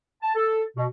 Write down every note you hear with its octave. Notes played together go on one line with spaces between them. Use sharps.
A5
A4
B2